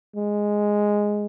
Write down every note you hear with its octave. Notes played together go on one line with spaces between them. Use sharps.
G#3